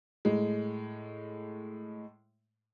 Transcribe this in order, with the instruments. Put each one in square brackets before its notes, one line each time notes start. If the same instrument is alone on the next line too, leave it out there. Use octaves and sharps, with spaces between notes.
[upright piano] A2 G#3